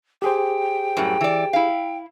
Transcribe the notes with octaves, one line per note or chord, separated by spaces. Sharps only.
G4 G#4 C5 G5
F#2 A2 G3
E3 D5
E4 F5